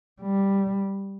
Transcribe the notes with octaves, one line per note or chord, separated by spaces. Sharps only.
G3